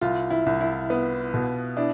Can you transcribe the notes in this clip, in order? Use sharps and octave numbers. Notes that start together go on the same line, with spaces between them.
C2 F4
E4
C2
E4
B3
B2
D4 E4